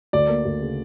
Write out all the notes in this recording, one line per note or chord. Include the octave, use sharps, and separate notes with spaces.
D2 D5
A#3
D2
C#3